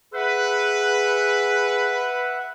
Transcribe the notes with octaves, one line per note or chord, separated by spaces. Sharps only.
G#4 B4 E5 F#5